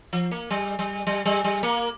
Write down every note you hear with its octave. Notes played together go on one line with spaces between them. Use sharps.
F3
A#3
G3
G3
G3
G3
G3
A#3